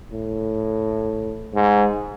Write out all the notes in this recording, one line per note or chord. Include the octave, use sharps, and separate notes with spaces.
A2
G#2